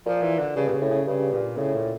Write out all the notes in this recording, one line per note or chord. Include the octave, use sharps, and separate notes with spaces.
A#2 F3
E3
D3
G2 C#3
A#2
C#3
A2
C#3
G2 C#3
A#2
A2 C#3
A#2